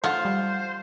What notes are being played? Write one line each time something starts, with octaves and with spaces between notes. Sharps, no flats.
A3 F4 C5 F#5
G3